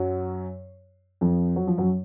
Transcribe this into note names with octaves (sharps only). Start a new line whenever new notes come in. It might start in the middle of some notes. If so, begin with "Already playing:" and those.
Already playing: F#2 F#3
F2 F3
F#3
F3
F#2 F#3